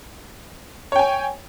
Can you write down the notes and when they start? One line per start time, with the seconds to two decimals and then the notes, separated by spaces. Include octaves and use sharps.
0.92 C#5
0.96 G5
0.99 G#5